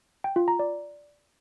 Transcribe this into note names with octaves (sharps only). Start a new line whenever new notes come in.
G5
F4
A#5
D5